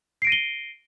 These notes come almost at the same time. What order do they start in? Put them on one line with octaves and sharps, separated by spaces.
C7 D7 A#6 D#7 G7